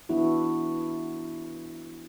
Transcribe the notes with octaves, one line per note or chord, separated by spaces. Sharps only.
E3 B3 D4 E4 F#4